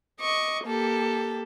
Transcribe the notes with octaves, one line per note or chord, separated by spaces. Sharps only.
D#5 C#6 D6
A#3 G4 A4